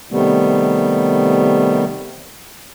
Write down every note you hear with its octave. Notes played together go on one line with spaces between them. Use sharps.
C3 D#3 G3 A3 B3